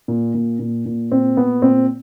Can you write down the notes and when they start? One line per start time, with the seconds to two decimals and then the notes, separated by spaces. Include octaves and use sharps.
0.08 A#2
0.34 A#2
0.59 A#2
0.86 A#2
1.11 A#2 C4
1.37 A#2 B3
1.62 A#2 C4